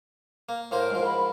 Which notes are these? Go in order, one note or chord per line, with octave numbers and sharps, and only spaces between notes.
A#3
A2 A#3 A#4 C5
G#2 F3
B5